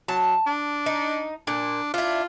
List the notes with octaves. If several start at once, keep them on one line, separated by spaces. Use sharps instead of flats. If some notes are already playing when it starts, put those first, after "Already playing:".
F#3 A5
D4
D#4
A#2 D4
D4 E4 F4